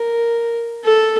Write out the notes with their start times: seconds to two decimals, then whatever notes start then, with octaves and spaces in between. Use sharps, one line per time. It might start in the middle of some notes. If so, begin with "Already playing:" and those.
Already playing: A#4
0.84 A4